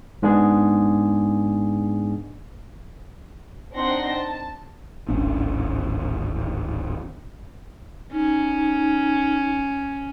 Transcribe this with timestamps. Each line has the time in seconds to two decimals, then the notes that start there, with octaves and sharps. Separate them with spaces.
0.22 G#2 G#3 B3 D4 G#4
3.74 C4 D4 D#4 F#5 C6 A#6
4.11 A5
5.08 D1 G#1 C#4 D4
8.12 C#4 D#4